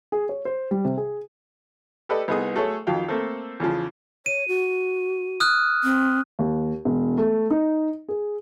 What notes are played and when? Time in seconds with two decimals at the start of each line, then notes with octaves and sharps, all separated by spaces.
0.12 G#4
0.29 C#5
0.45 C5
0.71 G3
0.85 C3
0.97 G#4
2.09 G4 A4 B4 D5 D#5
2.28 C2 B3 D#4 G#4 D#6
2.55 F#3 A3 G#4 A4 C#5
2.87 F2 D#3 F3 F#3 F5 G5
3.08 A3 A#3 C4 A4
3.60 E2 C#3 F3
4.26 C#5 D#7
4.48 F#4
5.40 D#6 F6 F#6
5.83 C4
6.39 D#2
6.85 E1
7.18 A3
7.50 D#4
8.08 G#4